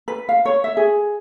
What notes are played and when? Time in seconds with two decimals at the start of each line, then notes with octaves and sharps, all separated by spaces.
0.08 B4
0.29 F5
0.45 C#5
0.64 E5
0.77 G#4